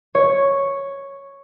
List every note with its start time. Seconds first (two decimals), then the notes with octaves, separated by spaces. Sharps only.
0.15 C#5